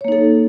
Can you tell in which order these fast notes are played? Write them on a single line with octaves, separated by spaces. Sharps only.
C#5 A#3 D#4 A4